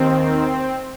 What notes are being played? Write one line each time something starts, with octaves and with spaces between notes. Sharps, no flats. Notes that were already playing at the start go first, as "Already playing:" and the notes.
Already playing: D#2 D#3 C4